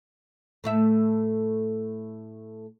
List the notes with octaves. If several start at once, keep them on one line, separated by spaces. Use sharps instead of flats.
A2 A3 E5